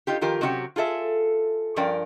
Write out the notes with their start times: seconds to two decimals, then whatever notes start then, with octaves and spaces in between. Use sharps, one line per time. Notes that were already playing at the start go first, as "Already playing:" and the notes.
0.07 D#4 F4 G4
0.21 D#3 F3 F4 G4 A#4
0.41 C3 F#3 C#4 D#4 F#4 G4
0.76 F4 G#4 A4 E5
1.76 G2 F3 C#4 A#4 D5 G5